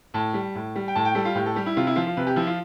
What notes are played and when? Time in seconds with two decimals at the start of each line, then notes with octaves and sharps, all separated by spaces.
0.14 A2 A5
0.34 G3
0.55 A2
0.75 G3
0.88 G5
0.95 A2 A5
1.05 G5
1.15 G3 A4
1.25 F4
1.35 A2 G4
1.46 A4
1.56 G3 G4
1.66 E4
1.77 C3 F4
1.87 E4
1.96 F3 F4
2.07 F4
2.17 C3 B4
2.27 G4
2.36 F3 E4
2.47 F4